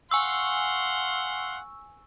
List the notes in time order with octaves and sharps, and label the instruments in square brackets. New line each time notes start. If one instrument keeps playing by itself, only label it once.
[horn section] F5 F#5 C6 [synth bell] G#5 C#6 E6